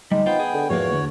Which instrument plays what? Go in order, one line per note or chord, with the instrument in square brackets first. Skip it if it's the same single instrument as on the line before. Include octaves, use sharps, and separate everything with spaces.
[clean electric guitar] D2 G3 [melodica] G#3 [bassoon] D#4
[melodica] B3 G5 [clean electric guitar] F4 C5
[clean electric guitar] G#4
[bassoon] D3
[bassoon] E2 [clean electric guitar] G#2 F3 A#3 [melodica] F#4 C#5
[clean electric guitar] D2 D3